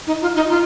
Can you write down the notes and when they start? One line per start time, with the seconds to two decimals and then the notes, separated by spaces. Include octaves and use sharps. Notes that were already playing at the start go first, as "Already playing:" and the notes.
0.07 D#4
0.22 F4
0.36 D#4
0.50 F4